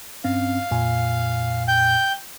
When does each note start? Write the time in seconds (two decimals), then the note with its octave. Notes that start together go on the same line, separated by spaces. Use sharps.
0.24 G2 C4 C#4 F5
0.71 F2 A#2 G#5
1.68 G5 G6